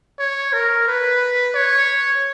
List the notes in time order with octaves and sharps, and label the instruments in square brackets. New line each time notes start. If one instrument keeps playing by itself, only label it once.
[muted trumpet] C#5
A#4
B4
C#5